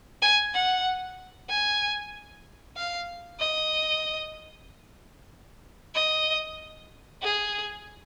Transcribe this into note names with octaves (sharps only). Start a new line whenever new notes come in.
G#5
F#5
G#5
F5
D#5
D#5
G#4